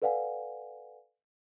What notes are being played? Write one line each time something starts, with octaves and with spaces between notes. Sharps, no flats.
A4 B4 D5 F5 F#5 G#5